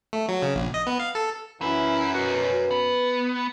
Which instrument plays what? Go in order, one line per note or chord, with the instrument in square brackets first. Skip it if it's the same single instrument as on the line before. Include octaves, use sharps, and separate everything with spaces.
[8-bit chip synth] A3
F#3
C#3
A#1
D#5
B3
F5
A4
[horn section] F#2 [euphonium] E3 [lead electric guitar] E4 E5
[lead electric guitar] B1 F#4 [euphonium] B4
[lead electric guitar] B3